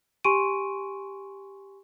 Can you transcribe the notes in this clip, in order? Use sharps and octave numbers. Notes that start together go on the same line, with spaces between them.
G4 G#5 C6 C#6 D7 D#7